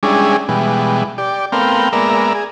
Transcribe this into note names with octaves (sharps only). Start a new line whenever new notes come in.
G3 G#3 C#4 D4 E4 G#4
B2 E3 G3 G#3
G4 D5
A3 B3 C4 A#4 F5 G5
G#3 A#3 B3 A#4 D5 E5
G#4